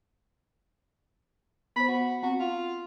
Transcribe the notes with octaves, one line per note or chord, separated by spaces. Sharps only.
B3 C5 B5
F#4
C4 F#4
F4